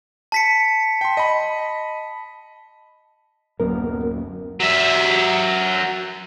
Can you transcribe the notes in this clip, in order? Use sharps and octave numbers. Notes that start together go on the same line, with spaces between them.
A5 B6 C#7
G5 C6
D#5 B5
D1 F#2 A#3 B3 A#4
F#3 E5